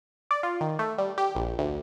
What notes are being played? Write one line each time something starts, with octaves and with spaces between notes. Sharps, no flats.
D5
F4
D#3
A3
G3
G4
A#1
D2